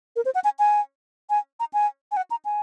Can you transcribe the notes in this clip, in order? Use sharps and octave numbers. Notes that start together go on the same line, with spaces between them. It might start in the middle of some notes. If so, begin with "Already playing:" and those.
A#4
C5
F#5
G#5
G#5
G#5
A#5
G#5
G#5
F#5
A#5
G#5